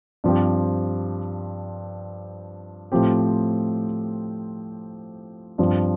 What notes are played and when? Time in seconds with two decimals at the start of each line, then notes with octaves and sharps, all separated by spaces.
0.24 G2 F3 C4 G4
2.92 A2 F3 C4 G4
5.58 G2 F3 C4 F4